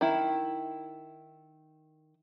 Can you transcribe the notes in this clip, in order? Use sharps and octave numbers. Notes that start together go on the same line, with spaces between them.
D#3 E4